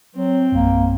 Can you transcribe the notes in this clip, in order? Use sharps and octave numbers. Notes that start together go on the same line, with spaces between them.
F#3 C4
A#1 F#2 A#3